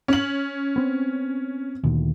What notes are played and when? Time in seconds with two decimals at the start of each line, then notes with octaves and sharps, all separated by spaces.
0.08 C#4 F#7
0.76 B3 C4
1.84 D2 A#2 D#3